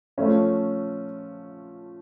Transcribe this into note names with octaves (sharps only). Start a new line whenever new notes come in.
F3 A3 C#4 F4